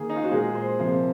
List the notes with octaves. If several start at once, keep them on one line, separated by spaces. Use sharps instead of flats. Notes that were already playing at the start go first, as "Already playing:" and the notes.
Already playing: D#3 A#3 G#4
D#4
F4
F#4
A#2 G#3 G#4
C5
C3 F3 A#3 C5